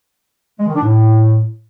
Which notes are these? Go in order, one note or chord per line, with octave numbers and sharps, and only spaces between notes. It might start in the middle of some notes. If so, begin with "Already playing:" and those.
G#3
D#3
D4
A2